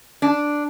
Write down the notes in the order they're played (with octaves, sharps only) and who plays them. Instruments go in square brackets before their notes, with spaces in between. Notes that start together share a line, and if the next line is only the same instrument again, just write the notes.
[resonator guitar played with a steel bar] D4